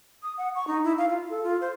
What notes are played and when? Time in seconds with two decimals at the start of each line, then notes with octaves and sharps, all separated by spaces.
0.23 D#6
0.38 F#5
0.55 C#6
0.67 D#4
0.85 E4
0.98 F5
1.10 F4
1.30 A4
1.44 F4
1.61 C5